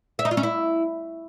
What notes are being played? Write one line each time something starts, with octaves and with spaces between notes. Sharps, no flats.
E5
D#4
F4
C#4
E4